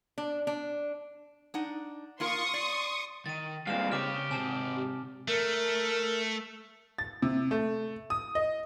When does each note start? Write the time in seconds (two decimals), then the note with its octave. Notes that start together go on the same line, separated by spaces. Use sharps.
0.18 D4
0.47 D4
1.54 D4 D#4 F#5
2.20 A#3 F4 A#4 C6 C#6 D#6
2.54 D5
3.26 D#3 A6 D#7
3.67 G2 A#2 G#3 C4 F5 F6 E7
3.92 C#3 G4 C#5 D6 F6
4.31 G#2 C3 C4 G#5 A5
5.28 A3 A#4
6.98 A6
7.22 C3
7.51 A3
8.10 D#6
8.35 D#5